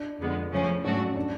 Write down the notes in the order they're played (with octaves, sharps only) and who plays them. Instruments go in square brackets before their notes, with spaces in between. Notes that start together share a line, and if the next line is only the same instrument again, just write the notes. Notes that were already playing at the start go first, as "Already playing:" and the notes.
Already playing: [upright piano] D4
[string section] F2 D3 G#3 B3
C#3 F3 A3 C#4
[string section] G#2 F#3 A3 D4 F#4 [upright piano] C#4
[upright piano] D4